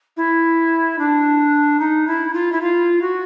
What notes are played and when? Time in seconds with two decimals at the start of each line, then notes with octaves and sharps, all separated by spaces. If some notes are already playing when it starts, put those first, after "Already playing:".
0.17 E4
0.98 D4
1.79 D#4
2.07 E4
2.33 F4
2.52 E4
2.61 F4
3.01 F#4